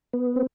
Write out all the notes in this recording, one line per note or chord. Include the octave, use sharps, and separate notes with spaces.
B3
C4